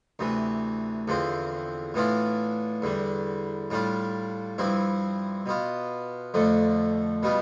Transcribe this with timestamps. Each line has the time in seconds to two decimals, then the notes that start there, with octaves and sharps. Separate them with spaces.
0.19 D2 C3 E3
1.08 E2 D3 F3 C4
1.94 A2 E3 B3 D4 F4
2.82 E2 D3 G3
3.70 A2 G3 D4 F4
4.58 G2 F3 C4 E4
5.46 B2 B3 F4
6.34 F2 D3 F3 A3
7.23 B2 G3 B3 F4